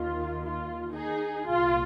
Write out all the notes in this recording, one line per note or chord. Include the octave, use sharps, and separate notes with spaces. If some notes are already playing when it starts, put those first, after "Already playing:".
Already playing: D#2 D#3 F4
F4
D#4 G#4
C2 A#2 F4